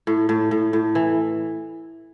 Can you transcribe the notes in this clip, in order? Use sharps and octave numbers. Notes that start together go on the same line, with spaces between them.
A2
A2
A2
A2
E3